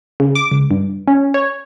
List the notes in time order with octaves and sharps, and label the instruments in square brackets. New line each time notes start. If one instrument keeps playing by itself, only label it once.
[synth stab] C#3
D6
C#2
G2
C#4
C#5